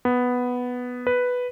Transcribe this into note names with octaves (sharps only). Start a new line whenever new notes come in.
B3
B4